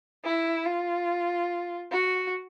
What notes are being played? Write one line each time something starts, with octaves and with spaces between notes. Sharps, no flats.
E4
F4
F#4